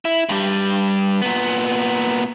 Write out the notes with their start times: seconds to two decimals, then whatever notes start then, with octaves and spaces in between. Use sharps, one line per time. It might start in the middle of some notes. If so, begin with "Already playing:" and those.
0.05 E4
0.29 G2 G3
1.22 A#2 B3